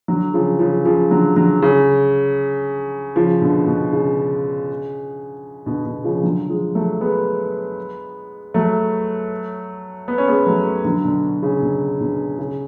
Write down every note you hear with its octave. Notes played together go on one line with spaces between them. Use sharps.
D3 F#3
C#3 F3
C#3 F3
C#3 F3
D3 F#3
D3 F#3
C#3
C#3 F3
B2 D3
B2
C#3
B2 D3
B2 D3
C#3 F3
D3 F#3
F3 G#3
F#3 A3
G#3 B3
F#3 A3
B3
C#4
G#3 B3
F#3 A3
D3 F#3
B2 D3
C#3
B2 D3
B2 D3
C#3